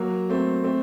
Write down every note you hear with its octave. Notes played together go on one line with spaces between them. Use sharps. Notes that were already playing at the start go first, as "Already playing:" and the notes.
Already playing: F#3 A#3
A3 C4
A3 C4